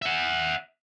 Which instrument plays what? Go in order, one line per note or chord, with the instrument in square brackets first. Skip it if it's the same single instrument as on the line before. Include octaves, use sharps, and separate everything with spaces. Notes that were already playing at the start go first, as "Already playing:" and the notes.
[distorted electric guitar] E5 F#5